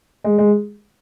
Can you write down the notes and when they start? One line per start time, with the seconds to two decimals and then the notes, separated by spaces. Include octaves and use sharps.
0.24 G#3
0.38 G#3